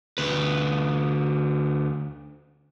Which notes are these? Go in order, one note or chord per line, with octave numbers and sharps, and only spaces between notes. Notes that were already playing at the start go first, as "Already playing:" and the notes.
D2 B4